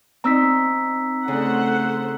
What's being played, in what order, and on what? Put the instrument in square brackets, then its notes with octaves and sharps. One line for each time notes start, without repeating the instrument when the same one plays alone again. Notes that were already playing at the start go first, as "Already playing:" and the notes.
[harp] C4 D#4 [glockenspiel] A#5 E6 B6
[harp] C#3 [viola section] A3 C5 F#5